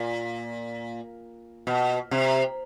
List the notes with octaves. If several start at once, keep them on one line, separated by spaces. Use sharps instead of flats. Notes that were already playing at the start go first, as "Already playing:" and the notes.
Already playing: A#2
B2
C3